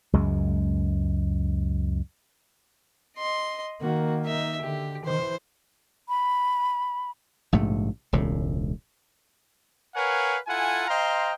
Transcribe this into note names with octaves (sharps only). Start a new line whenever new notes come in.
C#2 F#2 G#3
D#5 C6
D#3 A#3 F#4
D#4 E5
D3 G4
E3 C5
B5
A#1 G#2 C3 A3
E1 C#2 A2
A#4 B4 C#5 F5 F#5 G#5
E4 F4 A4 F#5 G#5
C5 D#5 F5 G5 A#5 C6